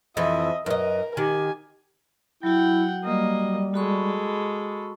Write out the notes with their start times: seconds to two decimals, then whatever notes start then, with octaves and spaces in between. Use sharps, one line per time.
0.17 F2 E3 D#5 E5
0.66 F#2 A#4 B4 D#5
1.17 D#3 G4 G#5
2.43 F#3 E4 F#4 F#5 G5
3.04 G3 A#3 D#5
3.74 G#3 F#4 A4 B5 C#6